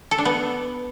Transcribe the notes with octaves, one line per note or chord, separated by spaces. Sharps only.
A4
D4
B3